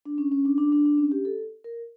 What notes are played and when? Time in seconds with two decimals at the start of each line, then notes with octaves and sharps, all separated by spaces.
0.05 D4
0.18 C#4
0.32 C#4
0.45 D4
0.58 D4
0.72 D4
0.85 D4
0.98 C#4
1.12 G4
1.25 A4
1.64 A#4